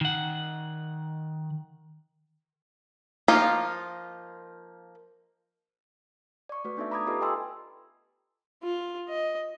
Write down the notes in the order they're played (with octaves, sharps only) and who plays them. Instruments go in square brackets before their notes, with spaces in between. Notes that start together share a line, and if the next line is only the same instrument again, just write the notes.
[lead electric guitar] D#3 F#5
[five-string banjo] F3 A#3 D#4 F4
[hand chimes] D5 C#6
A3 F#4 B4
B3 D4 D#4 A4 D5 E5
A#5 B5 D6 D#6 G#6
F4 G4 A4 B4 D#5
A4 D#5 G5 G#5 C6 E6
[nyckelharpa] F4
D#5